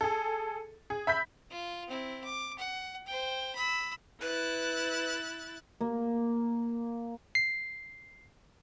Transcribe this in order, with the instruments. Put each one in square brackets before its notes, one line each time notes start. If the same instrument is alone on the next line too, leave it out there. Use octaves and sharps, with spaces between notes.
[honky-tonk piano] G#4 A4
G#4
E5 B5 G6 B6
[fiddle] F4
C4 E4
D6
F#5
C5 G5
B5 E6
[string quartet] E4 F#6 A6 [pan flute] B4
[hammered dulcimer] A#3
[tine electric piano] C7